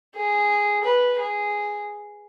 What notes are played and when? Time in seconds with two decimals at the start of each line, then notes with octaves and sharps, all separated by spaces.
0.15 G#4
0.84 B4
1.19 G#4